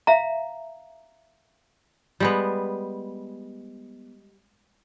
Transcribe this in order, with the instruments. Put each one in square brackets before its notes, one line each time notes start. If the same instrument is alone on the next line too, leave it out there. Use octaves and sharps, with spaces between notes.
[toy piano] E5 F5 A#5
[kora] G3 G#3 B3